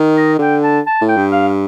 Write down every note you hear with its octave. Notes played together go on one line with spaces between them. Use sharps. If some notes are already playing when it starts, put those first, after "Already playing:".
Already playing: D#3
D#5
D3 G5
A5
A5
A2
G5
G2
F5